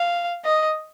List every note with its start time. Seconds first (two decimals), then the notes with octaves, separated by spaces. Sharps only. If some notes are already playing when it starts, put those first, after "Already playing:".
Already playing: F5
0.44 D#5